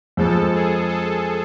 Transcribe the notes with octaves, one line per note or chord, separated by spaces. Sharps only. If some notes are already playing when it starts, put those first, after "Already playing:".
F2 F3 G#3 A4
G#4
A4